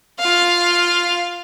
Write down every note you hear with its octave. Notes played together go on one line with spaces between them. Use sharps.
F4 F5